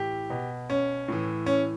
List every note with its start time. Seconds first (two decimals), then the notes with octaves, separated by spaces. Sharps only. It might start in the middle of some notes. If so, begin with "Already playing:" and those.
Already playing: A2 E3 G4
0.30 B2
0.70 C#4
1.08 A2 E3
1.46 C#4